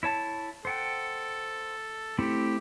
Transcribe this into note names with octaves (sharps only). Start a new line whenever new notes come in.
E4 C#5 A5
A4 C5 F#5 G5
A3 C4 E4 G4